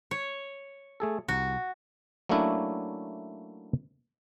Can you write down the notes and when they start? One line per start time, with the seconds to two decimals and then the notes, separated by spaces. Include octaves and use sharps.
0.11 C#5
1.00 A3 G#4 A4
1.28 C2 F#4
2.29 F#3 A3 A#3 C#4 D4 E4